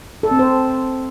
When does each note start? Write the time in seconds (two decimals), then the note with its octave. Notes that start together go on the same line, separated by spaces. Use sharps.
0.23 A4
0.31 C4
0.39 C5